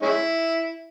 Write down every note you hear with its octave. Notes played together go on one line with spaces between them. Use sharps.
G#3 C#4 E4